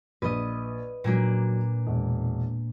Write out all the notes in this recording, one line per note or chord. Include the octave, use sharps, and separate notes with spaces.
A#1 B4 D#5
A#2 F3 F#3 A#3 D4
E1